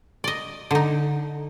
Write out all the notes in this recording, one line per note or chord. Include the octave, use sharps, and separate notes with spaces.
D5 D#5
D3 D#4